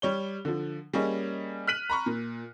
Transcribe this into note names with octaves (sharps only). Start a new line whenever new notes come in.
G3 C#5 G7
D3 F3
G3 A#3 C#4 G#4 C#5 D#5
F6 F#6 B6 D#7 F#7
A#5 B5 C#6
A#2